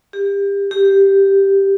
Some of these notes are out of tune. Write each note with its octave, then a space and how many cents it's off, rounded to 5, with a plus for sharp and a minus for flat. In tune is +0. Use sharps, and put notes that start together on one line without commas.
G4 +30
G4 +0